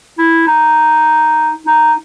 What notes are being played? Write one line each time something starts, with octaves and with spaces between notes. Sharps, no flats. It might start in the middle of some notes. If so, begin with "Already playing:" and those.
E4
D#4
D#4